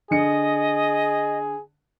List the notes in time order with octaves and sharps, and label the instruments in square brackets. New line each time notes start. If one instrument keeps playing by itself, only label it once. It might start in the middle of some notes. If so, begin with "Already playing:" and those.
[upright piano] D3 C#7 [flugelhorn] G#4 [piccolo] D#5